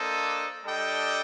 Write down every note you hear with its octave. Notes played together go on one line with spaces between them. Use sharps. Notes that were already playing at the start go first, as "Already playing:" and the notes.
Already playing: A#3 D4 A4 C5 D#5
G3 D4 A4 D#5 G5